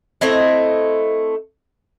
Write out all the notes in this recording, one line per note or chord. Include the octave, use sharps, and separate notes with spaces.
A3 C4 E4 D#5